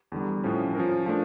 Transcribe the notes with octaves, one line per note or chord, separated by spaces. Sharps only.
E2 D3 G3
A2 F3 C#4
F3 C#4 F4 A#4
F3 A3 D4